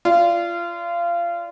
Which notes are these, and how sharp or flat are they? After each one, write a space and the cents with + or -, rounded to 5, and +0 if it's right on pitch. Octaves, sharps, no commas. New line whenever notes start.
F4 -25 D5 +0